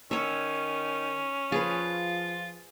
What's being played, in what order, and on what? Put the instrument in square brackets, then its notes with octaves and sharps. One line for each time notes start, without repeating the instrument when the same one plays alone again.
[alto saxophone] D#3 [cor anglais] C#4 [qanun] C#5 E5
[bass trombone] F3 [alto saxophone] F4 [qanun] G#4 B4